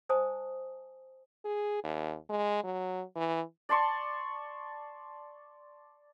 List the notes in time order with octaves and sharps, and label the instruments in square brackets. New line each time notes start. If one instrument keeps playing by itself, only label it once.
[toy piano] C5 D#5 G#5 A5 D#6
[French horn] G#4
D#2
G#3
F#3
E3
[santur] D5 A5 C6 C#6